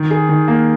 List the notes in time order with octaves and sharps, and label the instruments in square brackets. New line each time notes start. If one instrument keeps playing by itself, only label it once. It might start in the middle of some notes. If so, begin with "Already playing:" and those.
Already playing: [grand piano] D#3
G#4
D#3
A#3